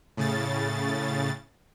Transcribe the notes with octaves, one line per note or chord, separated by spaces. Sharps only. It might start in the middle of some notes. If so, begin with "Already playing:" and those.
A2 C#3 A6